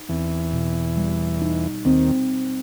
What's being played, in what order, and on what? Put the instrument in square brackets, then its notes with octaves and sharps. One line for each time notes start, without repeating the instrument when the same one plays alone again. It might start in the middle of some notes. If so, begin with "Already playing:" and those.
Already playing: [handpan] D#4
[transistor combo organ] E2 E3 [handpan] C4
[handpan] B2
G3
D#4
[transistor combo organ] D#2 D#3 [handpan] C4